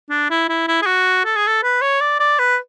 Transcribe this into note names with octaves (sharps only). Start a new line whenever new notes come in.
D4
E4
E4
E4
G#4
F#4
A4
G#4
A4
B4
C#5
D5
D5
B4